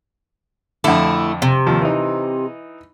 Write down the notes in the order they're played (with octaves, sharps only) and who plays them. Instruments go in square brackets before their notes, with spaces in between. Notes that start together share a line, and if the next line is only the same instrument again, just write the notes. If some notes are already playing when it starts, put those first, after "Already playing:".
[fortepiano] F2 D3 [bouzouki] A3 E4
[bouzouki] C3
[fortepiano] D#2 F3
E3 D#4